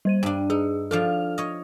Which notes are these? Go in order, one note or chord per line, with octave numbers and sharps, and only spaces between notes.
G3 C5 D#7
G2 D4 G5
D#4 G#4
F3 D4 F4 A4 F6 F7
C#5 D#5